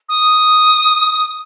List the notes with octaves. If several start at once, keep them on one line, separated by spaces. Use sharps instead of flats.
D#6